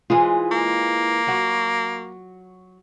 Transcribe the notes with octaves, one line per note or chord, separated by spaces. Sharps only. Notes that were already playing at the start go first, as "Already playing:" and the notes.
E3 G#3 F4 G#4
A#3
F#3 F#4